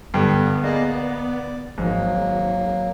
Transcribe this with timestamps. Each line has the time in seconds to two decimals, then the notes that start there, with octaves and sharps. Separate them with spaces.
0.14 G2 D3 B3 A4 G5
0.64 A#3 G#4 D5 D#5
0.88 D5
1.78 G#1 G#2 F3 F#3 A#3